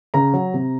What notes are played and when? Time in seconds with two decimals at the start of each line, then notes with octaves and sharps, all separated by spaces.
0.14 C#3 A#5
0.34 F#3
0.54 C3